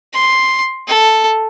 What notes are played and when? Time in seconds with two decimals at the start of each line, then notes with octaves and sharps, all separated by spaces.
0.14 C6
0.88 A4